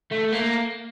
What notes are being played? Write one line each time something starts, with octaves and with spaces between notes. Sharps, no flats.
A3
A#3